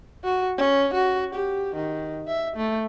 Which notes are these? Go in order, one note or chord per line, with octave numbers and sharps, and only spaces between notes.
F#4
C#4
F#4
G4
D#3
E5
A3